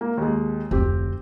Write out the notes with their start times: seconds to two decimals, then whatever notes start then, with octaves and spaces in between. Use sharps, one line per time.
0.01 A#3
0.18 D#2 G#3
0.71 F1 D2 C4 G4